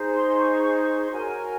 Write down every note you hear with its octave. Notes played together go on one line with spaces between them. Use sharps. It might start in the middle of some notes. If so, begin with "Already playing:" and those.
Already playing: D#4 G#4 C5
C6
C#6
C#6
C6
F#4 A#4 C#5 G#5